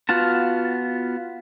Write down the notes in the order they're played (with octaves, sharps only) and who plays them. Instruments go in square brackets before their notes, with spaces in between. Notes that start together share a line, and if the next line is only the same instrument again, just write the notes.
[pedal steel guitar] B3 F4 F#4 A5